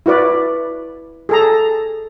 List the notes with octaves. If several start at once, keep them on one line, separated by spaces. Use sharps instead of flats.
E4 F#4 B4 D5
G#4 A4 A#5